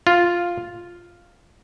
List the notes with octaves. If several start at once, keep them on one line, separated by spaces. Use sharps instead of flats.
F4